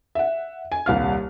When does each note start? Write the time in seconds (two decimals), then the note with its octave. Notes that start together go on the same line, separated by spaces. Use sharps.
0.15 E5 F#5
0.72 G#5
0.86 D#1 C2 F5 F6